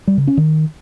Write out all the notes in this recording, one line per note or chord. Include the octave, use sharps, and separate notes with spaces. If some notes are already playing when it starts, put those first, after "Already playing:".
G3
C#3
C#4
D#3